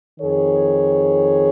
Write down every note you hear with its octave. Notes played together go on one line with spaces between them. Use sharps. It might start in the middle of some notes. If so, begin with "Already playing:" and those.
F2 D#3 G#4 C#5